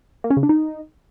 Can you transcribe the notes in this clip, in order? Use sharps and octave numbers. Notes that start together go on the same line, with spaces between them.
A#3
C#4
C#3
D4
D#4